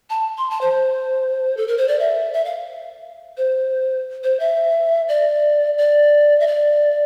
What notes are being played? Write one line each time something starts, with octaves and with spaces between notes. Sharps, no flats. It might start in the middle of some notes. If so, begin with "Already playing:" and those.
A5
C6
A5
C5
A4
A#4
C5
D5
E5
E5
F5
C5
C5
E5
D5
D5
E5
D5